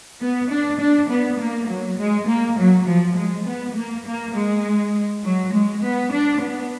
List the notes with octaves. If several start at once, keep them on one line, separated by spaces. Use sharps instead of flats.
B3
D4
D4
B3
A#3
F#3
G#3
A#3
F#3
F3
G#3
B3
A#3
A#3
G#3
F#3
G#3
B3
D4
B3